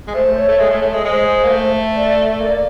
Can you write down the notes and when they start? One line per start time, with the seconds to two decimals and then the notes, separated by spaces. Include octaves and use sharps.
0.07 G#3
0.14 A3 C5
0.36 C#5
0.49 A3
0.59 G#3
0.70 A3
0.81 A3
0.93 G#3
1.04 G#3 C#5
1.09 C5
1.44 A#3
1.49 A3
1.95 D5
2.40 A#3